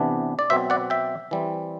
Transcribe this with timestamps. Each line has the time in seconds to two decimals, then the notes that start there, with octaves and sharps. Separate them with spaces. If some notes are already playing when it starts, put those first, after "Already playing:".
Already playing: C3 E3 B3 D4
0.39 D5
0.50 B2 F#3 C4 C5 E5
0.70 D5 F#5
0.90 E5 G5
1.31 E3 G3 C4